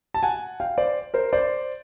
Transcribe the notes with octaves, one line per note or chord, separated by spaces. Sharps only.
A5
F#5 G#5
F5 G5
C5 D5
A#4 C5
C5 D5